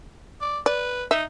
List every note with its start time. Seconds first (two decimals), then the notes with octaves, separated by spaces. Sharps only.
0.41 D5
0.66 B4 D5
1.11 D#4 E5